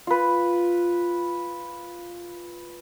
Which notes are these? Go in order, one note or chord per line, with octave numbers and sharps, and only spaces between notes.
F4 B4